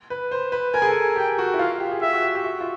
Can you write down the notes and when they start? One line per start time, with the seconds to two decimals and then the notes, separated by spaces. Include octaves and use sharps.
0.10 B4
0.31 C5
0.52 B4
0.74 A#4 G#5
0.82 G#4
0.88 A4
1.16 G4 G5
1.38 F#4
1.54 E4
1.59 F4 F5
1.80 G4
1.91 G#4
2.01 G4 E5
2.13 F#4
2.23 G4
2.35 G4
2.44 F#4
2.61 F4